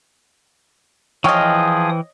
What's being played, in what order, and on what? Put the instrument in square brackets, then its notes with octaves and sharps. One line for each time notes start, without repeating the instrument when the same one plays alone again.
[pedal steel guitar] E3 G5 F6 [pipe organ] F3 G#4 D#6 [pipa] C#5 D#5